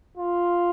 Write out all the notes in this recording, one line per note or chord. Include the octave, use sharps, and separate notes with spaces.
F4